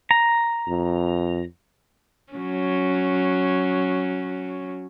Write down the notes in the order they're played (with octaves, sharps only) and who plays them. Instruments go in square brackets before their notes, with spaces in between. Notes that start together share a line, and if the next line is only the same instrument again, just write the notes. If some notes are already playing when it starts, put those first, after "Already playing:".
[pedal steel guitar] A#5
[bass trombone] F2
[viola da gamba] F#3 C#4